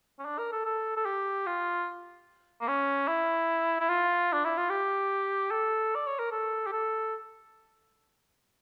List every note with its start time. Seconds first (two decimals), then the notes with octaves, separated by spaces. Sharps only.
0.19 C#4
0.25 D4
0.38 A#4
0.52 A4
0.65 A4
0.97 A4
1.06 G4
1.46 F4
2.61 A#3
2.68 C#4
3.08 E4
3.80 E4
3.89 F4
4.33 D4
4.45 E4
4.58 F4
4.70 G4
5.51 A4
5.95 D5
6.07 C#5
6.19 A#4
6.32 A4
6.66 G4
6.72 A4